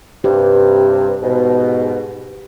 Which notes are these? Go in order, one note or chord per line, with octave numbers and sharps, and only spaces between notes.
G2 C3 G4
G#2 B2